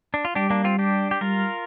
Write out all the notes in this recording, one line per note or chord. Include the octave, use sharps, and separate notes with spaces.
D4
F4
G3 D4 G4
A#3 D4
C4 F4
D4 G4
G4
G3 F4 A#4